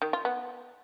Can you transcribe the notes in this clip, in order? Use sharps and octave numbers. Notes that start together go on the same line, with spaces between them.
D#3
F4
B3